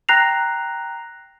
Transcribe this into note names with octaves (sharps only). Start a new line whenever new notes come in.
G5 A#5 F#6 A#6 C7 F7